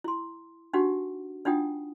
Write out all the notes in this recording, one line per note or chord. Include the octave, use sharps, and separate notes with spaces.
E4 C6
D4 D#4 F#4 G4 F#5
D4 D#4 F4 F#5 G5 D#6